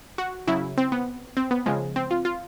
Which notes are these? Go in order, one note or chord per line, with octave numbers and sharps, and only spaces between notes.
F#4
C#3 F#3 E4
C4
B3
C4
B3
C#3 F3 G#3
C4
F4
F4